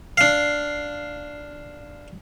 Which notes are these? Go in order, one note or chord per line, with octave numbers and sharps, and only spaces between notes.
D4 F5